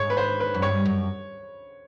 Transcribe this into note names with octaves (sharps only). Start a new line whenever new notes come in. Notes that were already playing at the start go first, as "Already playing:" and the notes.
Already playing: G#2 C#5
B4
C5
B4
F#2
G2 C#5
F#2